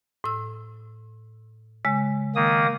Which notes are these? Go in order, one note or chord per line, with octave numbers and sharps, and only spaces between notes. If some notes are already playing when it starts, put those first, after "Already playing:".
A2 E6
C#3 G#3
D#3 A#3 D#6